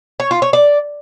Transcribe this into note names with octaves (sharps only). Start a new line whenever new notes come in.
C#5
F4
C#5
D5